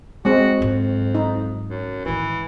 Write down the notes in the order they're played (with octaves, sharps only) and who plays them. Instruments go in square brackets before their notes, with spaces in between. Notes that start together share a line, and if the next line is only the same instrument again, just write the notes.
[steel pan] G#3 C4 [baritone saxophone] F#4
[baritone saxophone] F2 [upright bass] G#2 F#3
[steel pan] D#4
[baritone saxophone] F#2
[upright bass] G#2 D#3 [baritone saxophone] E3